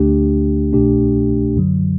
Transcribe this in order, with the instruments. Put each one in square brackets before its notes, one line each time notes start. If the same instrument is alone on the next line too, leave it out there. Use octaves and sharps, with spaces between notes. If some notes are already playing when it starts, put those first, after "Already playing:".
Already playing: [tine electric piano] D2 D3 A3 D4 G4
C2 B2 A3 D4 G4
F#2 D3 F#3